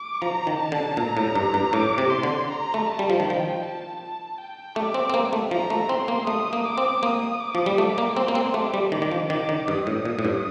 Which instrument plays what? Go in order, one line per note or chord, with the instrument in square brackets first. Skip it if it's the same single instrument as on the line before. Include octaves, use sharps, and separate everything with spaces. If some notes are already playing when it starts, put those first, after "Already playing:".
Already playing: [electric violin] D6
[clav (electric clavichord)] F3 [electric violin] A#5
[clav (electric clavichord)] D#3
[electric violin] A5
[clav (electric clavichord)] D3
[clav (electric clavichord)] A#2 [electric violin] A#5
[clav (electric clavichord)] A2
G2
G2
[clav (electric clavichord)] A2 [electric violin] D6
[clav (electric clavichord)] C3
[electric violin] C6
[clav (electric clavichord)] D3
[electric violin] A#5
[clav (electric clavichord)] A3
[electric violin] A5
[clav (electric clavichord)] G3
F3
[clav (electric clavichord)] D#3 [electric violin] G5
[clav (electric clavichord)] F3
[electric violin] A5
A5
G5
[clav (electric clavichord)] A3 [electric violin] D6
[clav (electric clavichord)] C4
C4
A#3
A3
[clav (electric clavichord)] F3 [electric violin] A#5
[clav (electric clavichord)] A3
[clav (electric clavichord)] C4 [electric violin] C6
[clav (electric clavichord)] A#3
[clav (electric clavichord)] A3 [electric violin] D#6
[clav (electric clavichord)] A#3
[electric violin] D6
[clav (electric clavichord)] C4
[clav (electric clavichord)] A#3 [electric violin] D#6
[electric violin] D6
[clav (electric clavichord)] F3
G3
[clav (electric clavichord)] A3 [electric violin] D6
[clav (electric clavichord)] A#3
[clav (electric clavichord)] C4 [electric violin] C6
[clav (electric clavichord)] A#3
C4
[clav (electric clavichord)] A3 [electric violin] D6
[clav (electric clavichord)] G3
[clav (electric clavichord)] D#3 [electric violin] D6
[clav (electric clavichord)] D#3
F3
[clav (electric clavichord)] D#3 [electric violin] D6
[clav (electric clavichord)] D#3
[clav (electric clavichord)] G2 [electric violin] D#6
[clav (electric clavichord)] A2
A#2
A2
G2